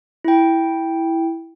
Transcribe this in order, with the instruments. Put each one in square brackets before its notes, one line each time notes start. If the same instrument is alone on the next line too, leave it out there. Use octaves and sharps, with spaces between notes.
[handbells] E4 G5